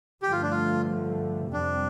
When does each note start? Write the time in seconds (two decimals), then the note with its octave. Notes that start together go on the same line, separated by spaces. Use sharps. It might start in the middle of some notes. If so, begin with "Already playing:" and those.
0.22 G2 D3 F3 A3 G4
0.32 F4
0.42 D4
0.51 F4
1.53 F2 C3 G3 C4 D4